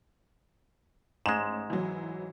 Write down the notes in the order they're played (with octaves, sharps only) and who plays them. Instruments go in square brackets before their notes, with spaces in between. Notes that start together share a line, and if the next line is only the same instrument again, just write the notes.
[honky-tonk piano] A1 E7 [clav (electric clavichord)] G#2 G#3
[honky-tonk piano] E3 F#3